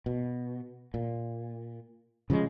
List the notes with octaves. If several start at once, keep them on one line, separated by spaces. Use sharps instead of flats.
B2
A#2
C#3 F3 G3 G#3